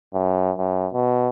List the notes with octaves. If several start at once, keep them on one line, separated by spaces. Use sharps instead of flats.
F#2
F#2
B2